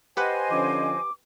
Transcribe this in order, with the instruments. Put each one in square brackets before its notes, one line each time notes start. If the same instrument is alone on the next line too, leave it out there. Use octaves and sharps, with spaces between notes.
[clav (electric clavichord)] G4 B4 F#5 [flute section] C5 D#5 G#5
[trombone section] D3 F3 C#4 [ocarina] D6